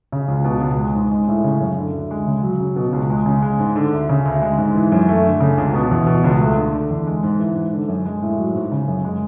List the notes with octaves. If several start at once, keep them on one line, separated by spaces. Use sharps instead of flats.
C#3
C#2
B2
C#2
G#3
G#2
G#3
A2
C#3
F#2
D3
D2
G#3
C#3
F#3
C#3
B2
C#2
G#3
C#3
G#3
G#2
D3
D2
C#3
D2
G#3
G#2
E3
F#2
A3
D3
C#3
C#2
B2
E2
B2
C#2
A3
D3
D3
E2
G#3
G#2
E3
G#2
D3
F#2
G#3
A2
F#3
G#2
C#3
F#2
G#3